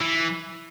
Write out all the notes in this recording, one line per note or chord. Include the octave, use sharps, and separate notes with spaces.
E3